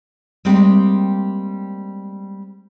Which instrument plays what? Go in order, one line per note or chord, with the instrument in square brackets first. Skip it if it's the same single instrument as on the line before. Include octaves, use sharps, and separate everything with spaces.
[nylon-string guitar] G3 G#3 A#3 C4 G4